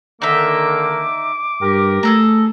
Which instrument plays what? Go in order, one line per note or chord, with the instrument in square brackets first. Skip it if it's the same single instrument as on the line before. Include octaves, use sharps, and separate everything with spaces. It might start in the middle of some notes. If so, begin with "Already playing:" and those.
[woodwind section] D3 D#3 A#3 [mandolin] D#4 E5 [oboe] D6
[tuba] G2 [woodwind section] G4 A#4
[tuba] A3 [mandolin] G#4 A4 A#5